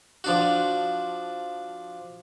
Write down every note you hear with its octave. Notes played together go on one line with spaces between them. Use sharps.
F3 D4 F#4